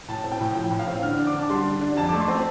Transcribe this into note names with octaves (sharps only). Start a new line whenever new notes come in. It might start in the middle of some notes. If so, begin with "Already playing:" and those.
A2 A5
C4
G5
A2
F3 G5
A2
F5
C4
D3 F6
D4
D6
D3 A5
G3 C6
D3
D4
F2 A5
D6
A3
C6
C4 A5